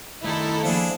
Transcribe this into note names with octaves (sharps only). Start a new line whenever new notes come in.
D#3 A3 D#4 E4 A4
F3 A#3 D4 G#4